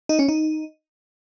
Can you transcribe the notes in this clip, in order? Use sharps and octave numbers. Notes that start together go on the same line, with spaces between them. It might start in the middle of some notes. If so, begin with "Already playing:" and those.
D#4
C#4
D#4